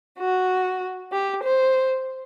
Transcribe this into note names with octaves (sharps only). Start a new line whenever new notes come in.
F#4
G4
C5